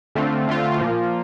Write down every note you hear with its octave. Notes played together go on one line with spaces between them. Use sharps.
D3 A3 C4 F4
D3 A3 C4 F4
A#2 F3 A#3 F4